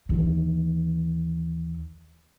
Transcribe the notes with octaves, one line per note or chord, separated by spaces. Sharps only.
D#2 E3